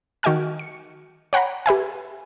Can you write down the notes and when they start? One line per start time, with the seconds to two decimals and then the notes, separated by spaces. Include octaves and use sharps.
0.23 D#3 F#4 D#5 G5 G#5 F6
0.59 C#7
1.33 C#5 F#5 G5 A#5 B5
1.66 G4 B4 E5 G#5